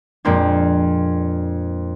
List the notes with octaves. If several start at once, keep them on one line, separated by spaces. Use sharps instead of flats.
F2 A#2 G#3 A#3 C4 D4